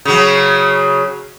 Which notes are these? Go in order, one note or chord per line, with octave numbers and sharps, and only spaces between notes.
C#3 F#3